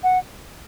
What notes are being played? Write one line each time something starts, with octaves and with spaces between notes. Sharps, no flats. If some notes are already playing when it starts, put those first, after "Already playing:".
F#5